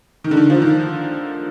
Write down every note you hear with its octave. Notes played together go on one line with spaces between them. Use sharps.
D#3
D3
D#3
F3
D#3